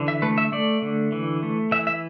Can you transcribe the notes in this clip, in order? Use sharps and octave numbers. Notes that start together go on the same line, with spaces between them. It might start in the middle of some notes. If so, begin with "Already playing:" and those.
Already playing: D3 E3
E5
A3 B4
E5
A3 D5
D3
E3
A3
E3 E5
E5